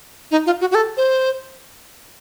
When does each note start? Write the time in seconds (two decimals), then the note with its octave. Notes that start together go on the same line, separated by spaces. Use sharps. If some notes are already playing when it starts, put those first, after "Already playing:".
0.31 D#4
0.46 F4
0.61 F#4
0.71 F#4
0.75 A4
0.97 C5